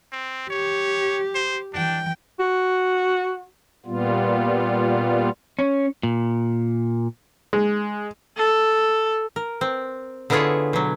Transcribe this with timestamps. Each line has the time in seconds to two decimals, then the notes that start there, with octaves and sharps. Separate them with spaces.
0.12 C4
0.50 G4 C#5
1.35 C5
1.73 E3 D4 G5
2.39 F#4
3.86 A#2 G3 B3 F4
5.59 C#4
6.03 A#2
7.53 G#3
8.38 A4
9.36 A#4
9.61 C4
10.30 D3 B3 E4 F4 G#4 C#5
10.73 B2 F#3